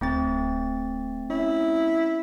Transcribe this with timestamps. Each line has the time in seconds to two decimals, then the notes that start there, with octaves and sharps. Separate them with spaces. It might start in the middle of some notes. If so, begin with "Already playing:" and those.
0.01 D1 A3 C4 A6
1.30 C#4 E4